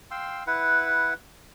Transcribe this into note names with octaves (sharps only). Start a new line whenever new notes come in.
F5 G5 C6 E6
E4 B4 F#5